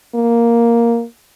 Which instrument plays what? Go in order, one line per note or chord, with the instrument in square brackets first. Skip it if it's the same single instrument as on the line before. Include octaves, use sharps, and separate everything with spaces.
[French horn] A#3